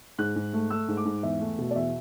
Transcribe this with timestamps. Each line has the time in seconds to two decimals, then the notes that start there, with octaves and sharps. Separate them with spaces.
0.18 G#2 F#6
0.36 G#2
0.53 A3
0.70 A3 E6
0.88 G#2
0.97 D6
1.05 G#2
1.23 E2 E5
1.40 A3
1.58 B2
1.71 D5
1.76 E2 E5